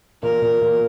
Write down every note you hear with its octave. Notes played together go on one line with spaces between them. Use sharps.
A#2 A#4
A#2
A#2